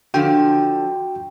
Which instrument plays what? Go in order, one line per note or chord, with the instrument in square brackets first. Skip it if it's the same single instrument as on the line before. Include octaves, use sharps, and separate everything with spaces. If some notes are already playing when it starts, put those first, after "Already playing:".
[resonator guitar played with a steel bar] D3 F3 [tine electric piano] F#4 G5